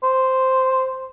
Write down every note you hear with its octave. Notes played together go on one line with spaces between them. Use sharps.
C5